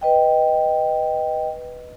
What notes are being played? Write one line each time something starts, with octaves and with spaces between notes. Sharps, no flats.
B4 D#5 G5